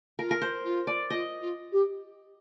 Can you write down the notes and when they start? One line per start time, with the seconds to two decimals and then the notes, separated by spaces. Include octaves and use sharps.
0.19 F4 A#4
0.31 A#4
0.42 C5
0.64 F4
0.87 D5
1.10 F4 D#5
1.40 F4
1.72 G4